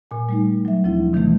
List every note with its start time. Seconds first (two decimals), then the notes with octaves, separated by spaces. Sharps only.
0.11 A#2 G#5
0.29 G3 A3 D#4
0.65 F#3 E5
0.84 D2 F3 C4 E4
1.13 B2 D#3 E3 G3 A3